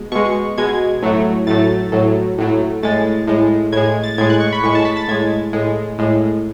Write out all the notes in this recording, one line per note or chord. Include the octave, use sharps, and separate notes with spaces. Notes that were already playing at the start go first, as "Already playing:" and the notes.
Already playing: B2 G#3
B2 G#3 C#6
B2 G#3 G#6
A2 F#3 A3
A2 F#3 A3 A6
A2 F#3 A3
A2 F#3 A3
A2 G#3 A6
A2 G#3
A2 G#3 G#6
A6
A2 G#3 G#6
F#6
C#6
B5
A2 G#3 C#6
A5
B5
A6
A2 G#3 G#6
A2 G#3
A2 G#3